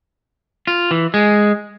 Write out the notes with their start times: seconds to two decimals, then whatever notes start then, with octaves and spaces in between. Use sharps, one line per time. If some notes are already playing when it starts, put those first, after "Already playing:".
0.67 F4
0.91 E3
1.14 G#3